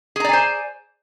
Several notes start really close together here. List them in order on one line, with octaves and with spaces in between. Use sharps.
G#4 A#5 D5 G#5 C5